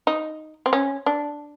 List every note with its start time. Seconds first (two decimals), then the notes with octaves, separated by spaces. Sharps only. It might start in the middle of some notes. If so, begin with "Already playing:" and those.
0.07 D#4
0.66 C4
0.73 C#4
1.06 D4